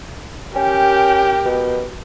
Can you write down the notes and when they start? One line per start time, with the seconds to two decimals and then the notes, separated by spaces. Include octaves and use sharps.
0.56 C#4 G4 A#4 G5
1.45 B2